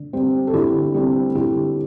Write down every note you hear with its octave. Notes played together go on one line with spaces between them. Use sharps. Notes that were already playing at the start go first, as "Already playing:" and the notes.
Already playing: D3
G3 C4
A4
D3 E4 G4
G3 C4
D3 E4 G4